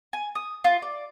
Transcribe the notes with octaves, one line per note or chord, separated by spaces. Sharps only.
G#5
D#6
F4
D5